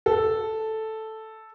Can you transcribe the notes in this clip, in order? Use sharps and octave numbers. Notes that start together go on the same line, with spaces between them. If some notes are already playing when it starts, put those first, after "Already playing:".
A4